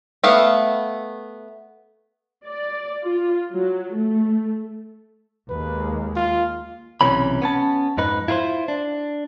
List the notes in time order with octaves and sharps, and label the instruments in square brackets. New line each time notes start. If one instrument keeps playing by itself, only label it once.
[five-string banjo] A3 B3 F5
[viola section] D5
F4
F#3
A3
[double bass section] D#2 G#3 A#3 [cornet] B4
[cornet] F4
[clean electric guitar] B1 C3 E3 C#4 B5
B3 C#4 A5
F2 G#2 D#4 B4
E4 F4 A#4 C5
D4